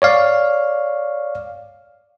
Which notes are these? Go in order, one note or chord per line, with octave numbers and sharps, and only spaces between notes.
C#5 D5 F5